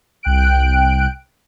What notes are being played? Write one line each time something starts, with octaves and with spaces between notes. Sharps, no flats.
C2 G5 F#6 D7